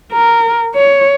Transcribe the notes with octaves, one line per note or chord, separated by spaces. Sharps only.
A#4
C#5